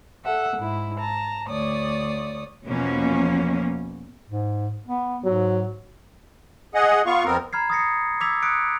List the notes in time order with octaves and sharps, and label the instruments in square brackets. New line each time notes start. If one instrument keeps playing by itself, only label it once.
[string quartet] A4 E5 F#5
G#2 E4
A5 A#5
D2 C#5 D5 D#6
[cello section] E2 B2 F3 A#3 C#4
[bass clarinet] G#2
B3
[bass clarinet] G#2 [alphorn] F#3
[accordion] G#4 D#5 F#5
B3 F4 F5 C#6
F2 B3 C4 A#4
[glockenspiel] A#5 B5 F6 G#6 C7
D#6 F6 A6 A#6 C7 C#7
D6 E6 G#6 B6 F7
D#6 F#6 B6 C#7 D7